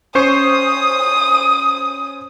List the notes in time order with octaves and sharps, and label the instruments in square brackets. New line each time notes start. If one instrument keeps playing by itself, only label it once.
[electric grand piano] C#4 C5 C#6 [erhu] D#6